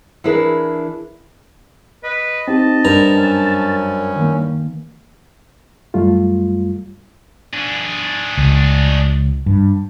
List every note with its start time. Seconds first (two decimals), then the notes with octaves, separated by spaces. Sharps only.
0.24 E3 D4 E4 G#4 A#4
2.03 B4 D#5
2.48 C4 D#4 G4 A5
2.85 G2 A#4 C5 A#5
3.17 F#2 C#4
4.16 D#3 A#3
5.94 F#2 G3 A3 F4
7.54 D4 G#4
8.37 C#2
9.46 G2